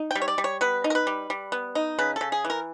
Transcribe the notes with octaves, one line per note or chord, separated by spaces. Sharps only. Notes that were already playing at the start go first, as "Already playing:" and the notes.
Already playing: D#4
G3 G5
C#5
D5
G3
C#5
B3 B4
D#4
A#4
B4
G3
G3
B3
D#4
C#3 B4
C#3 A4
G#4
E3
A#4